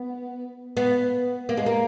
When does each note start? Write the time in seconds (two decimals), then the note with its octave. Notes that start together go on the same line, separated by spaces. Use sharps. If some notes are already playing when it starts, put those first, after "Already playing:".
Already playing: B3
0.77 B3
1.49 A#3
1.57 G#3
1.66 A#3